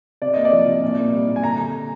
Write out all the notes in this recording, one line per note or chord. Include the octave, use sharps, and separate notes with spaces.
C3 D5
A#3 D#5
D5
F3
C3
A#2
A#3
G3
A#2
G#5
D3 A#5